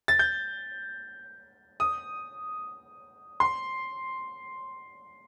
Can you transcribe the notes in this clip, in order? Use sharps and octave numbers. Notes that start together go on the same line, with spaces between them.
A6
G6
D#6
C6